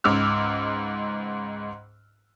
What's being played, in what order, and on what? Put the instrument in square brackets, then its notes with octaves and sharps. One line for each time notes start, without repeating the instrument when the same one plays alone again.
[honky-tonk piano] C#2 G#2 D6 E6 F6